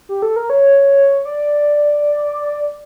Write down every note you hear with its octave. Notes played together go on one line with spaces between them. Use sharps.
G4
A4
A#4
C#5
D5